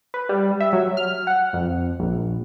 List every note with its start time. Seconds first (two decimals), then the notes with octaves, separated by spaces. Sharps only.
0.14 B4
0.29 G3
0.60 E5
0.73 F#3
0.97 F6
1.27 F#5
1.53 F2
2.00 A#1